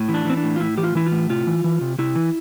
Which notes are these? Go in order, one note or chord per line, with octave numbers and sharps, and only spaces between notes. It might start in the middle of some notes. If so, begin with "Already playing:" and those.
Already playing: A2
E3
D4
E3 C4
D4
A2
F4
A2 E4
E3 G4
F4
E3 E4
F4
A2
C3 F4
E3
E3
C3
C3 E4
E3